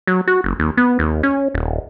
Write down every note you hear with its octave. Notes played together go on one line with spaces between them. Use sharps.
F#3
F#4
F#1
D#2
B3
D#2
C#4
D#1